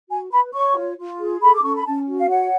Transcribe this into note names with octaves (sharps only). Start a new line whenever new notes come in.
F#4 G#5
B4 B5
C#5 C#6
F4
F4
G#4
A4 B5
D6
C#4 C#6
B5
C#4 A5
F#4
F5
C#5 F#5